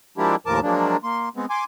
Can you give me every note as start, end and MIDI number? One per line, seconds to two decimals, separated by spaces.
0.18 0.36 53
0.18 0.36 56
0.18 0.36 58
0.18 0.36 62
0.18 0.36 64
0.18 0.36 67
0.46 0.60 39
0.46 0.60 45
0.46 0.60 53
0.46 0.60 70
0.46 0.60 81
0.46 0.60 86
0.63 0.97 53
0.63 0.97 54
0.63 0.97 56
0.63 0.97 58
0.63 0.97 62
1.03 1.29 58
1.03 1.29 84
1.36 1.46 56
1.36 1.46 59
1.36 1.46 60
1.50 1.64 80
1.50 1.64 84
1.50 1.64 86